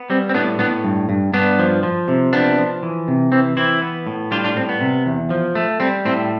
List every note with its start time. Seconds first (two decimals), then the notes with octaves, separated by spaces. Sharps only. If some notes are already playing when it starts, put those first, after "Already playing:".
Already playing: B3
0.10 G3 C4
0.29 C4
0.34 A2 B3 D4
0.59 A2 B3 D4
0.84 G2
1.09 G2
1.33 G2 B3 D4
1.59 F3
1.83 F3
2.08 C3
2.33 F3 B3 D4
2.58 F3
2.83 E3
3.08 C3
3.32 E3 C4
3.57 E3 C4 E4
3.82 B3
4.07 A2
4.31 G3 D4 F4
4.44 D4 F4
4.56 A2 C4
4.69 B3
4.81 C3
5.06 E2
5.30 F3
5.55 A3
5.80 G3 C4
6.05 A2 C4